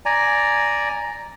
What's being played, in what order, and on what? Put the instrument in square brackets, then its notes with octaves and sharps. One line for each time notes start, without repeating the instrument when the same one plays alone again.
[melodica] D5 G#5 A#5